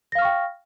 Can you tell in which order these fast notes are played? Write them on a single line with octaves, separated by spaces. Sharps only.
A#6 F5 F6 C#6 G5